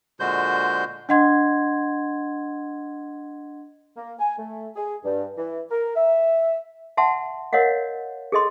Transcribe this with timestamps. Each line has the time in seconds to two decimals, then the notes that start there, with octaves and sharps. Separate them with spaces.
0.20 A#2 D3 G#3 F#4 C5 G6
1.09 D4 D#5 F#5 C6 G#6
3.97 A#3
4.19 G#5
4.38 A3
4.76 G#4
5.05 G2
5.37 E3
5.71 A#4
5.95 E5
6.97 E5 F#5 A5 C6
7.53 A#4 C#5 D#5 F5 F#5
8.32 G#4 A4 D#5 C6